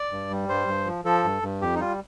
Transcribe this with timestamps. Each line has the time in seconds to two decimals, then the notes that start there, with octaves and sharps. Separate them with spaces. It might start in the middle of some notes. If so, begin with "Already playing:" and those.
Already playing: D5
0.12 G2
0.31 G3
0.49 G2 C5
0.68 G2
0.86 F3
1.05 F3 A4
1.24 G2
1.42 G2
1.61 F2 G4
1.76 D#4
1.79 G3 F4